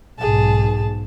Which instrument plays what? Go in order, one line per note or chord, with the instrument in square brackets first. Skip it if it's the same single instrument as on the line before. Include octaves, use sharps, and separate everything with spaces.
[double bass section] B1 G#2 [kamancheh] G#4 A5